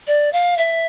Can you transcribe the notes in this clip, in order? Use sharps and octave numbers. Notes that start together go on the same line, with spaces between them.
D5
F5
E5